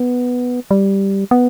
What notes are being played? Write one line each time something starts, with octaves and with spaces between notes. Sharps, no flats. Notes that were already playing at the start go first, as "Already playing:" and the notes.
Already playing: B3
G3
B3